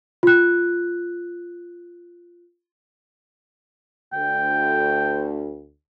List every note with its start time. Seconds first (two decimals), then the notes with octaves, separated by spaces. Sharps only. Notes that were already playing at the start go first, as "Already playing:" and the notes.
0.23 F4 F#6
4.13 D2 G5